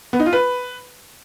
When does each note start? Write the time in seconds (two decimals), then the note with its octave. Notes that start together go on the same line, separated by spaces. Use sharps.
0.13 B3
0.20 D#4
0.26 F4
0.33 B4